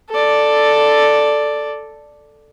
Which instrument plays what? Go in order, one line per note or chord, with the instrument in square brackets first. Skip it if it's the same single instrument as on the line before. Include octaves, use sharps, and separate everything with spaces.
[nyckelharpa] A4 D5